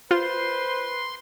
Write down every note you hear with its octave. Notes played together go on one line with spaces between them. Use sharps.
F4 B4 C5 C6